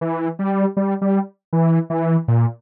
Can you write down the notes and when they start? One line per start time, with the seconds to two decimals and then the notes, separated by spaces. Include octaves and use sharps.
0.01 E3
0.39 G3
0.77 G3
1.01 G3
1.53 E3
1.90 E3
2.28 A#2